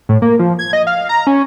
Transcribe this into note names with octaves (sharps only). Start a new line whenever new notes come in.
A2
A#3
F3
G#6
D#5
F5
A#5
C#4